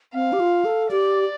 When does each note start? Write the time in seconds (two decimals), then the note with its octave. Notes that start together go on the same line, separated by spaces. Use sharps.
0.14 C4 F5
0.33 G4
0.40 F4
0.65 A4
0.91 G4 D5